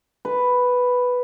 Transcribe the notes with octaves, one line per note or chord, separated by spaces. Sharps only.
B4